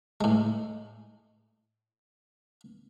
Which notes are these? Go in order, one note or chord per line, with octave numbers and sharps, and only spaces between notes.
A2 G#3